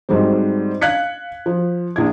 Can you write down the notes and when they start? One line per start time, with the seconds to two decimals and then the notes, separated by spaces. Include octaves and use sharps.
0.09 G#2 F#3 G3 C4
0.81 F5 F#6 G#6 B6 C#7
1.46 F3
1.96 A#1 E4 G#6